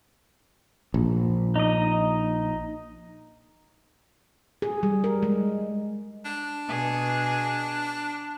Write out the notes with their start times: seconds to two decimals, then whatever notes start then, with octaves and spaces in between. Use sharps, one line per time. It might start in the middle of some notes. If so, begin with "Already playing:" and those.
0.94 A#1
1.56 D#4 D#5
4.62 G#4
4.83 G3
5.04 A#4
5.23 G#3
6.25 D4
6.68 B2 G#4